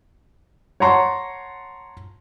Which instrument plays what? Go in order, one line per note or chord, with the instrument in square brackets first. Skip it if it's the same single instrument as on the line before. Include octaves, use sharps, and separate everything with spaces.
[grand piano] C#5 F#5 A5 A#5 C6 C#6